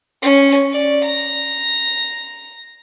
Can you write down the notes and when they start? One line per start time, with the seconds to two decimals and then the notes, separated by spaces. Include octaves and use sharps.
0.22 C#4
0.72 D5
1.03 A#5